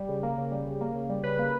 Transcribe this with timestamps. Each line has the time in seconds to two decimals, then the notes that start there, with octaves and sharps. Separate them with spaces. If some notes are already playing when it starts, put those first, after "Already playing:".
Already playing: G3
0.09 C#3
0.23 A#3
0.38 C#3
0.51 G3
0.67 C#3
0.81 A#3
0.95 C#3
1.09 G3
1.23 C#3 B4
1.39 A#3